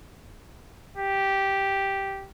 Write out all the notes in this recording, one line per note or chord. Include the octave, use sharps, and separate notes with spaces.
G4